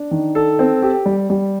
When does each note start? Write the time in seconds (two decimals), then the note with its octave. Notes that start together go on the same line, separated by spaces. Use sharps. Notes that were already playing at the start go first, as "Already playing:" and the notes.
Already playing: D4
0.11 D#3
0.35 A4
0.59 C4
0.82 G4
1.06 G3
1.30 G3